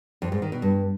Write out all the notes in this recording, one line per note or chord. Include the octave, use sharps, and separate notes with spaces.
F2
G#2
D#3
B2
G2